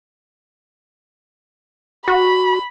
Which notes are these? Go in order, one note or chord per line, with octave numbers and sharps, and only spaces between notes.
F#4 B5